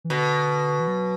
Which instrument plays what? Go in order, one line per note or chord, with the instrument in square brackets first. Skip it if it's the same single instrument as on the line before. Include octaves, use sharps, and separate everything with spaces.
[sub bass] E3
[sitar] B2 [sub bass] D3
[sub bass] E3
F#3